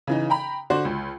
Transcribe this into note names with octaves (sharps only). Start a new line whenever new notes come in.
C#3 E3 D#4
G5 A#5 B5
D3 D4 F#4 C5
C#2